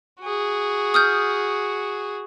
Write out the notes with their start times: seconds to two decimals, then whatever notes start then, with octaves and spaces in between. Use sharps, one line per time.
0.22 F#4 G#4
0.94 D#6 F6 G6